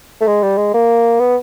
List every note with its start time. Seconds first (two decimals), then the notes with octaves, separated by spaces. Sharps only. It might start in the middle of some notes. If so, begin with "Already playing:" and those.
0.21 A3
0.27 G#3
0.43 G3
0.58 G#3
0.74 A#3
1.20 B3